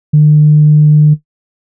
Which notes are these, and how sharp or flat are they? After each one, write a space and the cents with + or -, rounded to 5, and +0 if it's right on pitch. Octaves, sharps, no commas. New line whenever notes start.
D3 +45